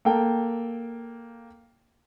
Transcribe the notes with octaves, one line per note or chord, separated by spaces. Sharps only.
A#3 A4 G5